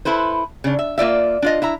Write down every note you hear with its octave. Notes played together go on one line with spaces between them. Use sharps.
E4 A4 B4 C5
C#3 D4
E5
A#3 F4 D5 E5
D4 F4 D#5
E4 E5 A#5